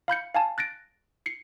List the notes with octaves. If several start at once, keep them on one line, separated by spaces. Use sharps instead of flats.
F5 B5 G6 C#7
F5 G#5 A5
F#6 A6 A#6 D7
C7 C#7